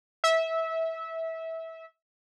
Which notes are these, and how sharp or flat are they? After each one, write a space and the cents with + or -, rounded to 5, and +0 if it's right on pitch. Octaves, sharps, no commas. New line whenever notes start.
E5 -20